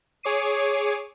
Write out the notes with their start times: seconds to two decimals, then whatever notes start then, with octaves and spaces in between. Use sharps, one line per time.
0.23 G#4 C#5 D6 C7 D#7